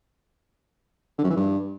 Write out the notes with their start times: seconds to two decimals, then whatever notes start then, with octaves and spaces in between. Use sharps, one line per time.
1.18 D3
1.24 F#2
1.30 E3
1.36 G2